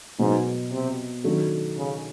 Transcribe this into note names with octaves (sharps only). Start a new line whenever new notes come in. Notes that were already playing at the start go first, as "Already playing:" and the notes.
G#2 B2 F#3 B3
C3
D#3 F#3 A3 D4
C#3